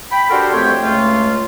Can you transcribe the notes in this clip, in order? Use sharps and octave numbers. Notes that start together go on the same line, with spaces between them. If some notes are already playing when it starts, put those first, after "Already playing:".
G5 B5
D4 F#4 G4 A4 A#4 C5
F2 G3 A3 C4 C#5 G5
C#2 A3 F4